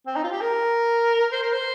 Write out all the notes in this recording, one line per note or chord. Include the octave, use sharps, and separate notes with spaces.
C4
D#4
F4
G4
A#4
C5
A#4
C5